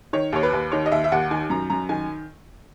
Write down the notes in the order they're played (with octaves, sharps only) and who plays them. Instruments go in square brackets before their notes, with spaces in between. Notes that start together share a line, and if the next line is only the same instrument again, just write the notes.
[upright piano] D#3 C#5
D#2 C#5
B4
D#2
D#3 C#5
D#5
D#2 E5
E5
D#2 F#5
D#3 G#5
F#2 A#5
F#2 A#5
D#3 G#5